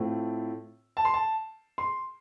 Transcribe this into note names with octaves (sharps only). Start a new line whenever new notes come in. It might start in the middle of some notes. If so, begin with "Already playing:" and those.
Already playing: A2 A3 C4 F4
A5
C6
A5
C6